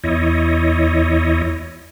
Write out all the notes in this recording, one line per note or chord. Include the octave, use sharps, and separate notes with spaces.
E2 E4 C#5 D#5